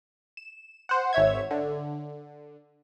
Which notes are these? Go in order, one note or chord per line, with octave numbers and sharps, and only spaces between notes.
E7
C5 F#5
G#1 C#5 E5 G#6
D3